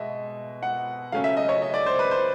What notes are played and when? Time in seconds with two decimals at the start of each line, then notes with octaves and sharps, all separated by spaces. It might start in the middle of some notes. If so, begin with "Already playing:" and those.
Already playing: B2 G#3 D#5 E5
0.63 F#5
1.12 C#3 F#3 A3 C#4 F5
1.24 E5
1.37 D#5
1.49 C#5
1.62 D#5
1.74 D5
1.86 C5
1.99 B4
2.11 C5